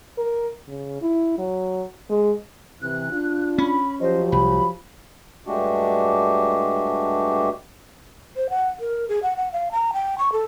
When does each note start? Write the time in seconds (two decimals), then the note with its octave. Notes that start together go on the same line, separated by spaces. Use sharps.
0.18 A#4
0.68 C#3
1.02 E4
1.38 F#3
2.10 G#3
2.81 C3 E3 F#6
3.11 D4 F4
3.58 C#4 B5
4.00 F3 F#3 G4 C5 D#5
4.32 C2 B5
5.46 G2 G#3 A3 D4 F#4 G4
8.36 C5
8.50 F#5
8.80 A#4
9.09 G#4
9.23 F#5
9.37 F#5
9.53 F5
9.72 A#5
9.93 G5
10.18 C#6
10.32 A4